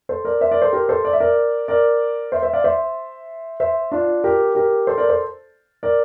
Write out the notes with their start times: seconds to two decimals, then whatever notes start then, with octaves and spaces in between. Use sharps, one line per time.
0.09 A4 C5
0.25 A#4 D5
0.41 C5 E5
0.51 A#4 D5
0.62 A4 C5
0.73 G4 A#4
0.89 A4 C5
1.05 D5
1.13 E5
1.20 A#4 D5
1.68 A#4 D5
2.32 C5 E5
2.42 C5 E5
2.53 D5 F5
2.64 C5 E5
3.60 C5 E5
3.91 D4 F4
4.24 G4 A#4
4.55 G4 A#4
4.87 A4 C5
4.98 A#4 D5
5.09 A4 C5
5.83 A#4 D5